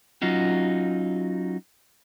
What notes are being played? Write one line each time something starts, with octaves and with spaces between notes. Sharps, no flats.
F#3 C#4 D#4 F4 F#4